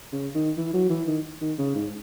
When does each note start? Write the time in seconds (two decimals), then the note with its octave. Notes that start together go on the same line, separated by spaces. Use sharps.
0.13 C#3
0.35 D#3
0.57 E3
0.74 F#3
0.90 E3
1.07 D#3
1.41 D#3
1.58 C#3
1.75 G#2